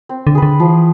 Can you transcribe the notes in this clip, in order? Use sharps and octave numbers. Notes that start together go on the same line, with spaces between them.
C4
D3
G#4 B4
D3
E3 F3